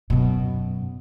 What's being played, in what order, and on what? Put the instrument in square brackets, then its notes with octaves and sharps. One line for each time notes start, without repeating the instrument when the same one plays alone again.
[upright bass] F#2 B2